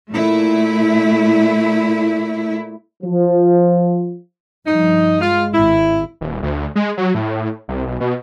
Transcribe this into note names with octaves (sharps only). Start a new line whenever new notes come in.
A#2 A3 E4
F3
G2 F3 D#4
G#3 F4
G#1 E4
D#1
D2
G#3
F#3
A2
C2
B1
B2